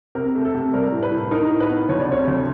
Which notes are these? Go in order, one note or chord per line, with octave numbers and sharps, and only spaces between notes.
C3 A#4
A3
A4
C3
G3 A#4
A2
B4
A2
D#4 A#4
A2
B4
B3
D2 C#5
D5
C3 C#5
D2